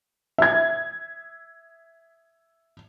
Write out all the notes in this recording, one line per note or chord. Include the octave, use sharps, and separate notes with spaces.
E5 G#6